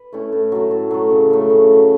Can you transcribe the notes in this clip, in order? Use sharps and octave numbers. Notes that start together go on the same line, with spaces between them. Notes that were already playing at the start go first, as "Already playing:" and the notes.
Already playing: B4
A3 C#4 E4
A2
F#3 A3
A2
F#3 A3
C#3
F#3 A3
C#3
F#3 A3